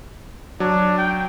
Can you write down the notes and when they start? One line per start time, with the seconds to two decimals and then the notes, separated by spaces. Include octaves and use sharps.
0.60 F#3 D4
0.98 G5